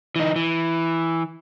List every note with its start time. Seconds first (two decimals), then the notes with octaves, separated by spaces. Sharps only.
0.16 E3 D#4
0.36 E3